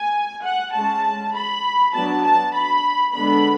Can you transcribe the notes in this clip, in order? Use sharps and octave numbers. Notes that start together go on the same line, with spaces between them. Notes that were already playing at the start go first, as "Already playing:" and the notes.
Already playing: G#5
F#5
G#3 C#4 A5
B5
F#3 B3 D4 A5
A5
B5
D3 G#3 B3 D4 B5